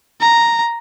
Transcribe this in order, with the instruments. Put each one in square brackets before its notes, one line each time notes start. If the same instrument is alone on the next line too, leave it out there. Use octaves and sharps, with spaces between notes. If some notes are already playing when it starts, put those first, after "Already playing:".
[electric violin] A#5